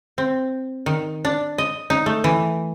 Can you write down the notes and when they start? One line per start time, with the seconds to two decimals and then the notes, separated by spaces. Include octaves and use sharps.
0.18 C4
0.86 D#3
1.25 D4
1.58 D#5
1.90 D#4
2.06 A3
2.24 E3